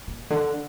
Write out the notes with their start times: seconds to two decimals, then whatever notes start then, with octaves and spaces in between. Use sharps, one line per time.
0.07 A#2
0.30 D3